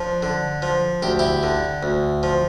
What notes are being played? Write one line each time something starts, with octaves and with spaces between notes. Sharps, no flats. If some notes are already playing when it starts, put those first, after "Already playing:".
Already playing: F3 D4
D3
F3
D2 G4
E4 G4
D3
D2
F3